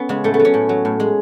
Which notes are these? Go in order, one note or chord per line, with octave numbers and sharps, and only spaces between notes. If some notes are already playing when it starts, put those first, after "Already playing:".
Already playing: B3 C#4
C#3 G#3
A2 A3
B3
F#3
C#4
A2
F#3
A2
G#3